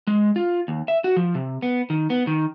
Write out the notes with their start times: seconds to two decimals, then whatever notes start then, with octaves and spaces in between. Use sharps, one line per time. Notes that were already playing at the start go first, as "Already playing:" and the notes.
0.07 G#3
0.36 F4
0.68 D#2
0.88 E5
1.04 F#4
1.17 F3
1.35 C3
1.62 B3
1.90 D#3
2.10 B3
2.27 D#3